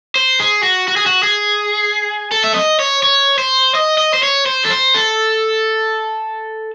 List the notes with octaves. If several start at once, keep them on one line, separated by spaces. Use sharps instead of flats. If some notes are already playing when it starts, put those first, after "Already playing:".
C5
G#4
F#4
F#4
G#4
F#4
G#4
A4
E5
D#5
C#5
C#5
C5
D#5
D#5
C5
C#5
C5
A4
C5
A4